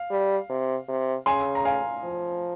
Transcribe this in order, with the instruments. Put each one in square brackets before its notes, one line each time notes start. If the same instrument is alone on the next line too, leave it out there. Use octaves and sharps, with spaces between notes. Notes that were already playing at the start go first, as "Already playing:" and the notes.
Already playing: [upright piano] F5
[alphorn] G3
C3
C3
[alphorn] C#3 [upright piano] G#5 C6
[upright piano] A#5
F5 G#5
[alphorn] F3